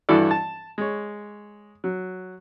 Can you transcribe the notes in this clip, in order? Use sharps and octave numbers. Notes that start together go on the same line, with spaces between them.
G2 E3 E4 F#4 A4 D5
A5
G#3 C#5
F#3